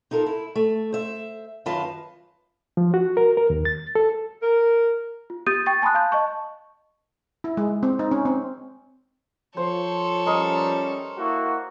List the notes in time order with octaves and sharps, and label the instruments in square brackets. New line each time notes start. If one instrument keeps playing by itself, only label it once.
[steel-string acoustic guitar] D#4 F4 A4 A#4
E4
A3
C5 E5
F#2 D#3 F4 B4 F5 A5
[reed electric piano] F3
F#4
A#4
A#4
D#2
A6
A4
[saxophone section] A#4
[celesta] F4
G4 D#6 G6 A6 D#7
G5 C#6 A6
G#5 A5 B5 C6 D#6 F#6
F5 A5 G6
D#5 A5 C#6
[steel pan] E4
G#3
C4
D#4
C#4
C4
[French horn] F3 [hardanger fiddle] A4 C#5 [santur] C5
[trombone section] G3 C#4 [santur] A#4 D#5 C6
[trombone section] A#3 E4 F#4